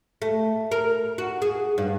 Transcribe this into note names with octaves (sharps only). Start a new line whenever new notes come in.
A3
A#4
F#4
G#4
G2